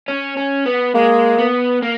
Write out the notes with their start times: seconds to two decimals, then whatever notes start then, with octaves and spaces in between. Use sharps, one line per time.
0.08 C#4
0.37 C#4
0.66 B3
0.95 G#3 A#3
1.39 B3
1.82 A#3